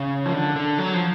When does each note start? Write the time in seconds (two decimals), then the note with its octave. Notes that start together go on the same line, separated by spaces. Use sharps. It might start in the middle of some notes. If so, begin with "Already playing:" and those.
Already playing: C#3
0.26 F3
0.33 D3
0.56 D3
0.78 F#3
0.94 F3